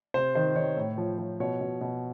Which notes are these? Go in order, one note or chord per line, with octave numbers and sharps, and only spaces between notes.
C3 C5
D#3 C5
D#3 C#5
A2
F3
F3
B2 C#5
B2
B2